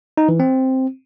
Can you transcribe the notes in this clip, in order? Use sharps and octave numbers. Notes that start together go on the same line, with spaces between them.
D#4
E3
C4